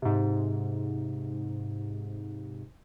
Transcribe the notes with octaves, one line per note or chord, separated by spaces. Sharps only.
G#2 C3